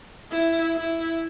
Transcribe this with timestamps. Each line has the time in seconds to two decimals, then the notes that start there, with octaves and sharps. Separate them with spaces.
0.32 E4
0.76 E4